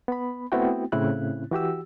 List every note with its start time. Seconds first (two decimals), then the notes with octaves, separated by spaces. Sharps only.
0.08 B3 B5
0.52 A3 B3 C4 E4 F#4 G5
0.92 A2 C#3 C4 C#4 E4 F#6
1.51 E3 F#4 G4 E6